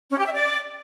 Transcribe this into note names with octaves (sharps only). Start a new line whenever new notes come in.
C#4
G4
E5
D5